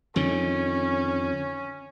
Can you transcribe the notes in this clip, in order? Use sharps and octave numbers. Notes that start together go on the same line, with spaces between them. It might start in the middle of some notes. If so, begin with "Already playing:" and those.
F2 D3 D#3 C#4